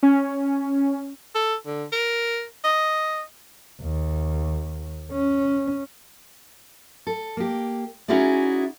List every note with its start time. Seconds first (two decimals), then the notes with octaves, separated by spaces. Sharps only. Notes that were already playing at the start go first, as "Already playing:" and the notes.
0.03 C#4
1.34 A4
1.66 D3
1.92 A#4
2.64 D#5
3.82 D#2
5.12 C#4
7.07 A4
7.37 A#3 G4
8.08 C#4 D#4 E4 F#4 G#4 D5